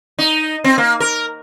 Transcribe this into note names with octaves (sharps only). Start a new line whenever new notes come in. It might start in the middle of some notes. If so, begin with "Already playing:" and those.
D#4
C4
A#3
A#4